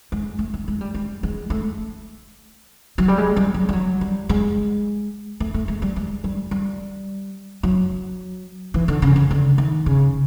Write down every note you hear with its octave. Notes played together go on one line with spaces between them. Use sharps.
G#3
A3
G#3
G#3
G3
G#3
G#3
A3
F#3
G3
G#3
G3
F#3
G3
F#3
G3
G#3
A3
A3
G#3
G3
G#3
G3
G3
F#3
E3
D3
C#3
C#3
D3
D#3
C#3